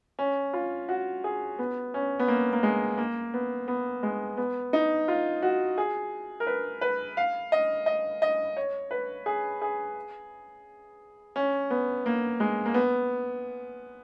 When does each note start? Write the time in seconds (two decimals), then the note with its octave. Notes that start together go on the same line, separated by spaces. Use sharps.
0.19 C#4
0.53 F4
0.89 F#4
1.24 G#4
1.59 B3
1.94 C#4
2.19 B3
2.28 A#3
2.53 A#3
2.63 G#3
2.98 A#3
3.34 B3
3.68 B3
4.03 G#3
4.37 B3
4.73 D#4
5.08 F4
5.42 F#4
5.78 G#4
6.40 A#4
6.47 B4
6.81 B4
7.17 F5
7.52 D#5
7.86 D#5
8.22 D#5
8.57 C#5
8.91 B4
9.26 G#4
9.62 G#4
11.36 C#4
11.70 B3
12.06 A#3
12.40 G#3
12.66 A#3
12.74 B3